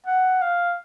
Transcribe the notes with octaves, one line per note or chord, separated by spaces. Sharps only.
F#5
F5